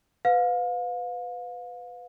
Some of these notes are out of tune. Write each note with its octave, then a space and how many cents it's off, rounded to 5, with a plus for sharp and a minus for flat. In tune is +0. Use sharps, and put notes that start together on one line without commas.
B4 +20 F5 +30